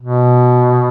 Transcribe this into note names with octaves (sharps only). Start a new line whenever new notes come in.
B2